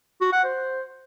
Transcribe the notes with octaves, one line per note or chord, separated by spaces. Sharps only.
F#4
F#5
C5